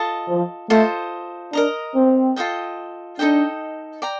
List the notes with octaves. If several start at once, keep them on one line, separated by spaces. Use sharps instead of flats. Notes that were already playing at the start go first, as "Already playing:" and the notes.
Already playing: F4 A4 D#5 A5
F3
A3 F4 A4 C5 D#5
D4 A#4 D#5 A#5
C4
F4 A4 D#5 G5
D4 D#4 A4 D#5 G5
D5 G5 A#5